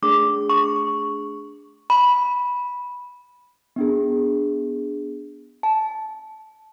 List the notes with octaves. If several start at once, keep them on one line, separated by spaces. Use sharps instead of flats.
A3 D4 G#4 D6
C#6
B5
B3 D4 G#4
A5